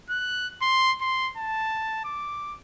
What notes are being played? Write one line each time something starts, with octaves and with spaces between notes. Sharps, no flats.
F#6
C6
C6
A5
D6